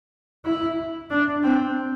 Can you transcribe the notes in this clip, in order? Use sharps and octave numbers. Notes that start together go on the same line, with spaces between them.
E4
D4
C4